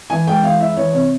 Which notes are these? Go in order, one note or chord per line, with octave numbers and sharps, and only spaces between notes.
E3 G#5
G#3 G5
E3 F5
E4 E5
E3 C#5
C3 C#5